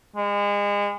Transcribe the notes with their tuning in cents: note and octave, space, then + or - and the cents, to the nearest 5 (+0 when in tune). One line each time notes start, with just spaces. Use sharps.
G#3 -30